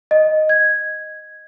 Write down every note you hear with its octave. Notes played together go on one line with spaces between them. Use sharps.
D#5
G#6